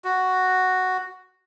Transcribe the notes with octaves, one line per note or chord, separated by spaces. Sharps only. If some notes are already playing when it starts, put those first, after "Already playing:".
F#4